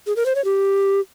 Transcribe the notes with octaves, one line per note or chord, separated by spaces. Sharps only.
G#4
A#4
C5
C#5
G4